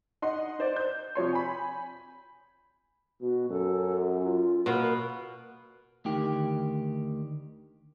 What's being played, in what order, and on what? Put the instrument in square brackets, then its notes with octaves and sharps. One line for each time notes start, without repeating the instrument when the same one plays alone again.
[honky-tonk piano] D#4 D#5 F#5 C6
D#4 C5 D5
G6
C3 F3 C#5 C6
G#5 B5
[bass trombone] B2 [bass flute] F#4
[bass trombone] F#2 [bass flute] A4
[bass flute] F4
[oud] B2 [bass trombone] A#3 [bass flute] A#4
[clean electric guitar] D2 D#3 G4